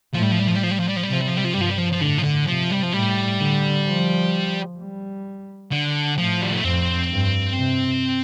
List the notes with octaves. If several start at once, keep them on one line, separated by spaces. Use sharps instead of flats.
A2 F3
G3
F3
G3
F3
G3
F3
G3
F3
G3
F3
G3
C3 F3
G3
F3
G3
F3
G2 G3
F3
G3
F3
F3
A2 D3
F3
D3
C3 F3
G3
F3
A2 G3
D3
F3
G3
D3
A2 F3
G3
A3
F2 C4
G2
C3